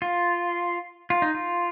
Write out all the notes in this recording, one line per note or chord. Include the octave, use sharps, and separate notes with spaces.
F4
F4
D#4
F4